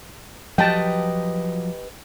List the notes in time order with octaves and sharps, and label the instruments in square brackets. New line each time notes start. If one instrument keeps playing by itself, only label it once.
[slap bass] F3 F#3 [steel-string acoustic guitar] G4 B4 D#5 [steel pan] G5 A5